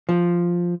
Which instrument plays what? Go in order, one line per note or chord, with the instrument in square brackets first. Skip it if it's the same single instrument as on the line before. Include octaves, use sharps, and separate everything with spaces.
[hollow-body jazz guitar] F3